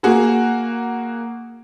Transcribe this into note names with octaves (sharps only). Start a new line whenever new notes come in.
A#3 F#4 G#4